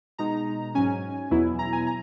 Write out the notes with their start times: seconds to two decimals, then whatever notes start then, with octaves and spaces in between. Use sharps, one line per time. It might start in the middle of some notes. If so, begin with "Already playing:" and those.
0.18 B2 G#3 D#4 A#5
0.75 G#2 F#3 C#4 G#5
1.30 E2 B2 F#3 B3 E4
1.59 A#5
1.73 G#5
1.87 A#5